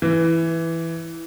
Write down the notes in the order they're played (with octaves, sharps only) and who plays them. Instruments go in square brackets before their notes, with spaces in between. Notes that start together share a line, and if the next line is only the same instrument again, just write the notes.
[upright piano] E3